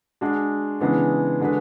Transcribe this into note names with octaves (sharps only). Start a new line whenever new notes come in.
G#3 D4 F#4
C#3 E3 G#3 B3 D4
D3 G#3 D4 F#4 B4